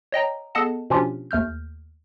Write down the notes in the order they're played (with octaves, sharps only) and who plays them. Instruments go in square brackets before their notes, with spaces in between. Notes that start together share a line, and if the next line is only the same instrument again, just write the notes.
[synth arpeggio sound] C#5 D#5 G5 A#5
B3 G#4 A4 D#5 F#5 A5
B2 F3 C#4 D4 F4 G4
D#2 A3 F6 G6